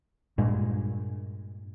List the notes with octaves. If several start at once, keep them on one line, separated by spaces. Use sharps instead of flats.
G2 A#2 G#3